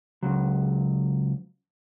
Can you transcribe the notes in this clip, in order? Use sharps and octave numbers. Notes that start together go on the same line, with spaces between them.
C#2 F#3